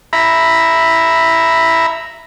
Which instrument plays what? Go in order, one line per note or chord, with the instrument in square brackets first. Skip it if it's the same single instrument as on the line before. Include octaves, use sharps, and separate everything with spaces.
[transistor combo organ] E5 A#5 B5